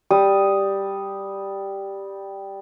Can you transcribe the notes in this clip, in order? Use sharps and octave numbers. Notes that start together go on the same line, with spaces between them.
G3 D#6